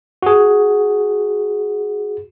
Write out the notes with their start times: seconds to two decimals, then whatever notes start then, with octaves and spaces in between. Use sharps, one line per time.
0.23 F#4 G#4